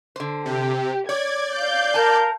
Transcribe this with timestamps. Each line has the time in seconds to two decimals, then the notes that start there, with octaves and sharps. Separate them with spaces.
0.16 D3 C5
0.46 C3 G4
1.09 C#5 D5 G#6
1.54 F5 G6
1.94 A#4 G#5 A5